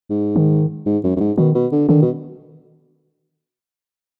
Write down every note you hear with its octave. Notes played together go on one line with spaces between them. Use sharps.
G#2
D#3
G#2
F#2
F#2
G#2
B2 D#3
B2
D3
D3 D#3
B2